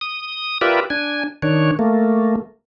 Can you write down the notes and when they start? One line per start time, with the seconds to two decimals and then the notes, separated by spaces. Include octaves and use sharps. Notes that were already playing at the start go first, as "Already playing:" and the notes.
0.01 D#6
0.61 F4 G4 A#4 B4 D5 E5
0.90 D4 G#5
1.42 D#3 D4 C#5
1.79 A3 A#3